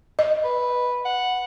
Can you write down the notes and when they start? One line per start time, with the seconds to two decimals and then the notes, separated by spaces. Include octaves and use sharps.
0.19 D#5
0.44 B4
1.05 F#5